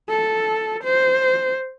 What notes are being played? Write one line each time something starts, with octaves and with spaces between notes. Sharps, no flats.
A4
C5